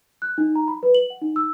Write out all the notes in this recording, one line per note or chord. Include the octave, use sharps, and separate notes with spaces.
F#6
D#4
A#5
B5
B4
F#7
F#5
D#4
E6